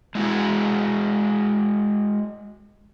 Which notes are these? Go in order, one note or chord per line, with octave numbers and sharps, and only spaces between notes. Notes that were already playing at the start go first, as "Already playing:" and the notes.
G#3 E4 F#4 G#4